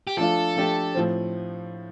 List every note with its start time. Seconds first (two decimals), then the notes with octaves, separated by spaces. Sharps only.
0.07 G4
0.17 F3 A3 D4 F4 A4
0.56 F3 A3 D4 G4
0.95 A2 F3 C4